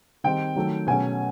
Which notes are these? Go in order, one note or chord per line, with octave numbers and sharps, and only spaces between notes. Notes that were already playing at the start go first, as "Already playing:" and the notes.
D#3 G3 C4 D#4 G5
D#3 F#3 A3
B2 F#3 A3 C#4 G#5